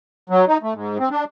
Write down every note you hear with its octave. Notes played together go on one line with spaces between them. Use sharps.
F#3
D#4
A3
G#2
C4
D4